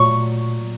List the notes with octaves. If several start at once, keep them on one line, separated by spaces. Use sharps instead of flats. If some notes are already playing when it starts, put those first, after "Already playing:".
Already playing: A#2 F#3 A3 C#6